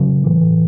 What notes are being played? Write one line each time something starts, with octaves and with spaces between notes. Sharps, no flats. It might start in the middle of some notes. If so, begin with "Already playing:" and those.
Already playing: C#3 F#3
A2 E3